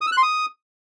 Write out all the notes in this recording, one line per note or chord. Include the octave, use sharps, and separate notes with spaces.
D#6
E6
F#6
C6
D#6